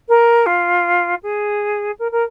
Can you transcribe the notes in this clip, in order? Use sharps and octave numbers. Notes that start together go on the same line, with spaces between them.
A#4
F4
G#4
A#4
A#4